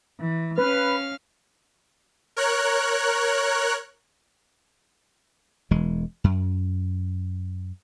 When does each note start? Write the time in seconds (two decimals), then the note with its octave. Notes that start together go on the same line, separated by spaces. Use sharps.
0.19 E3
0.57 C#4 B4 F5 F6
2.36 A#4 C#5 F#6
5.71 E1 E3 G#3
6.24 F#2